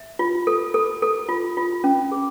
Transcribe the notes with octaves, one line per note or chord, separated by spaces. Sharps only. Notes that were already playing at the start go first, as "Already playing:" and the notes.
Already playing: E5
F4
A4
A4
A4
F4
F4
C#4
G#4